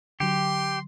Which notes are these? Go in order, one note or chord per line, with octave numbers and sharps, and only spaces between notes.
D3 F#3 G4 C6